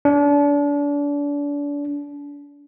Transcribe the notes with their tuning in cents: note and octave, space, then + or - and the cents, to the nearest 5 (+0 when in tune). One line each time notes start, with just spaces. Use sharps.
D4 -35